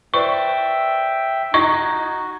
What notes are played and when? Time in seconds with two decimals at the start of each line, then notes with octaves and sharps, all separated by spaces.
0.14 B4 C5 D5 E5 G5 C#6
1.54 D#4 F#4 D#5 C#6 G#6 A#6